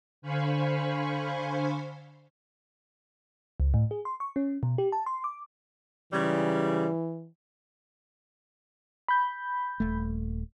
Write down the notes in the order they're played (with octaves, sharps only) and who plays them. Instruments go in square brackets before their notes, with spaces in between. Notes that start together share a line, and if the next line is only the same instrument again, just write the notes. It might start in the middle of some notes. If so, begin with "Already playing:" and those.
[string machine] D3 C5 F5 G#5 B5 C#6
[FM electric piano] C#2
A2
G#4
C6
C#6
C#4
B2
G4
A5
C6
D6
[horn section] G#2 C#3 G3 [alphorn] E3
[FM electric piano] B5 G6
[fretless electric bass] D#1 A3